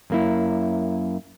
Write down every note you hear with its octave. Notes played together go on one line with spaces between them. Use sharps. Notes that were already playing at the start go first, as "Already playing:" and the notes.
F#2 A#3 E4